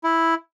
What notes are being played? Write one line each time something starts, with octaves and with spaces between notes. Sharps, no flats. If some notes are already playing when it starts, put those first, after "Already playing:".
E4